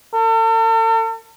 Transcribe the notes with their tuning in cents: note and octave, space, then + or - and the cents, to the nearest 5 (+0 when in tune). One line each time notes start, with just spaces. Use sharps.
A4 +45